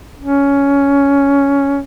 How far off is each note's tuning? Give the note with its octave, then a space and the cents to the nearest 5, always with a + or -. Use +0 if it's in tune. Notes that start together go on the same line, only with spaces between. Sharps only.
C#4 +10